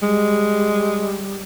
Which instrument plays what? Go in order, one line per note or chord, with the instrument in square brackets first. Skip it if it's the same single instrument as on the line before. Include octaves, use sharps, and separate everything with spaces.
[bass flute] G3 [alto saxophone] G#3